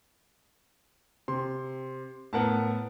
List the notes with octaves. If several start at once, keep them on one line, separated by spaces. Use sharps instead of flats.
C3 C6
A2 B3 A#4 F#5 A5